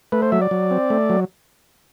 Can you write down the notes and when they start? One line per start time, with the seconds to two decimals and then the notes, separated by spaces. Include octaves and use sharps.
0.12 A3 B4
0.22 C5
0.32 F#3 E5
0.42 D5
0.51 F#3
0.71 C4
0.90 A3
1.10 F#3